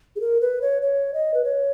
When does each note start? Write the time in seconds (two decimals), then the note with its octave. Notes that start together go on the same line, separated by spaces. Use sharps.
0.16 G#4
0.21 A#4
0.41 B4
0.62 C#5
0.82 C#5
1.14 D#5
1.34 B4
1.44 C#5